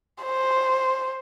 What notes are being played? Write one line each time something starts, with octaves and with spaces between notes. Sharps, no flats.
C5